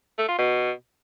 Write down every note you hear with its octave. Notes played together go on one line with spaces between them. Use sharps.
A3
F4
B2